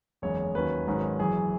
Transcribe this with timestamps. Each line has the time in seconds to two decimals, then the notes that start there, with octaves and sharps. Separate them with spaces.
0.22 F#1 E2 C#3 G#3 C#4 C#5
0.55 D#2 D#3 F#3 C#4 B4
0.87 G#1 G#2 D#3 F#3 C#4
1.19 F#1 F#2 E3 G#4